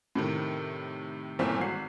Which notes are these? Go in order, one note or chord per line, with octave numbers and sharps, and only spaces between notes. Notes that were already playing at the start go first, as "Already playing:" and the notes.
A2 C3 D#3
G1 A#2 C4 C#4 E4 E6
G#1 F#4 C7